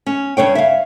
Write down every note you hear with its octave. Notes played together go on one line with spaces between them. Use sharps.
C#4
G2 C#3 C#5 G5
E5 F5